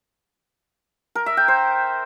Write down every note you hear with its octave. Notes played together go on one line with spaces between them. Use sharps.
A#4
E5
G5
C5